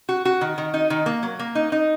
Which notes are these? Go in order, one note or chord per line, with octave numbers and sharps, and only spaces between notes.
F#4
F#4
D#3
D#3
D#4
D#3
A#3
F#3
A#3
D#4
D#4